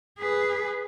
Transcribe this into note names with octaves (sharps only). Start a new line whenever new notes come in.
G#4 B4